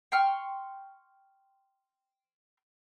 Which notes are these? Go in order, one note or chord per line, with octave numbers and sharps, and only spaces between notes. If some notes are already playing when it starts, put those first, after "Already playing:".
G5 C6 C#6 F6